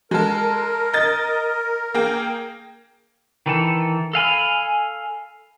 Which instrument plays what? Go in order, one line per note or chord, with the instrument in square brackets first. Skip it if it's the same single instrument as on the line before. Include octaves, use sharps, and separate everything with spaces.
[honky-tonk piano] G#3 A4 [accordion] A#4
[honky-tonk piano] D#5 A6
A#3 G#4 G5
[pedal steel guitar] D#3 E3 A4
A4 F5 G#5 B5